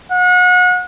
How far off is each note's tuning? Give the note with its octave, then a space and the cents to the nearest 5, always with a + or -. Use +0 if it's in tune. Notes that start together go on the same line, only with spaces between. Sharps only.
F#5 -35